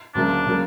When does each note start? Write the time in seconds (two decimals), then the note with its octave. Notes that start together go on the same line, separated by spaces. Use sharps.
0.15 D2 C#3 F#3 A#3 D4
0.46 C#3 F#3 A#3